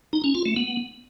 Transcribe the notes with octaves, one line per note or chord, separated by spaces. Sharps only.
D#4
C#4
F4
A3
B3